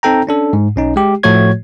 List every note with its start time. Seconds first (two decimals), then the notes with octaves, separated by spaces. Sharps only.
0.03 C4 D#4 A4 G5 A#5
0.27 C#4 D4 A4
0.53 G#2
0.76 B1 C#4 D#4
0.96 G#3 G4
1.23 A2 F3 A3 F#4 C#5 G#6